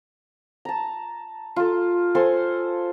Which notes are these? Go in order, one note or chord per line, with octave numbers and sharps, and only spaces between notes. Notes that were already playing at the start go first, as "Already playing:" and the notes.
A5 A#5
F4 A4
A4 C5 F5 G#5